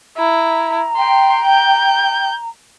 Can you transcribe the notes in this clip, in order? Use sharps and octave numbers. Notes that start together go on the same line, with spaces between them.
E4 A#5
G5 C6
G6